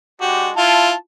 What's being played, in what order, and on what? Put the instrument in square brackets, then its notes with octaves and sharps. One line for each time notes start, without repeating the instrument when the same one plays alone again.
[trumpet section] G#3 D4 G4 [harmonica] F#4
[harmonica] E4 F4 [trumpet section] A5